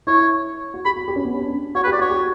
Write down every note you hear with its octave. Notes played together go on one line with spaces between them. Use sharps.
E4 C#5
F#4
G4 B5
F#4
G4
C#4
B3
C#4
D4
F#4 C#5
B4
G4
D5
F#4 C#5
G4